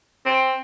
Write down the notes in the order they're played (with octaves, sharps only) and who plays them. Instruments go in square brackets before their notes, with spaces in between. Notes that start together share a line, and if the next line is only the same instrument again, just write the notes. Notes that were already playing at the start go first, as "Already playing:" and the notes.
[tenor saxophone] C4